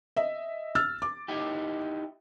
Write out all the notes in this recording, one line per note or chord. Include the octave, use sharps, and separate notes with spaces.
D#5 E5
E6 F6 A6
D6
D#4 E4 G4